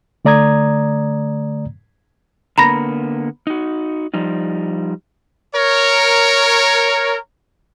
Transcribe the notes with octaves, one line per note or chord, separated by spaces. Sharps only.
D3 A3 D5 A#5 D#6 G#6
D3 A#3 B3 A#5 B5 A#6
D#4 F#4
F3 G3 D#4
A#4 C#5